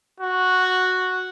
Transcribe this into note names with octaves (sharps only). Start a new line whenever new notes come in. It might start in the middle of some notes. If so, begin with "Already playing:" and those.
F#4